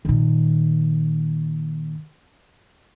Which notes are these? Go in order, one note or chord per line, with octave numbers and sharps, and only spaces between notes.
A#2 D#3